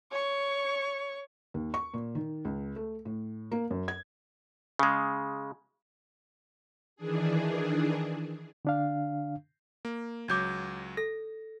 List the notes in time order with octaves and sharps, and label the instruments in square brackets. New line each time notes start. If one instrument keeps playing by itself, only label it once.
[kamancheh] C#5 C#6
[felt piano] D#2
C#6
A#2
D#3
C#2
A3
A2
A#3
F#2
G#6
[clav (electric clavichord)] C#3 G#3
[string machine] D#3 E3 D4 G#4
[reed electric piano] D3 D4 F5
[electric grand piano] A#3
[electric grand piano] C#2 F#3 [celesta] D6 G6 G#6
[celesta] A4 [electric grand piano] A#6